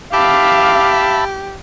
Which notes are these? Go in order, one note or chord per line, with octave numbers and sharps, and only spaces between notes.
G4 E5 F5 A5 B5 D6